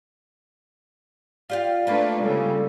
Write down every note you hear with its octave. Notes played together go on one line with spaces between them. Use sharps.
F4 G4 D5 F5
A3 A#3 D4 F4 B4
C#3 G3 G#3 A4